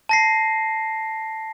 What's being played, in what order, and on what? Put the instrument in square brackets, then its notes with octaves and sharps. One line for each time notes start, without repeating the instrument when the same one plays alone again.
[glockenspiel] A5 A#6 C7